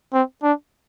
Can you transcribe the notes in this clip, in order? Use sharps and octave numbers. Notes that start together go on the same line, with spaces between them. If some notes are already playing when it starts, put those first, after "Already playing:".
C4
D4